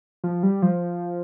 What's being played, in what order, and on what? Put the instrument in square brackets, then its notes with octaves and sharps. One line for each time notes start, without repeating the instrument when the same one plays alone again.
[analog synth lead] F3
G3
F3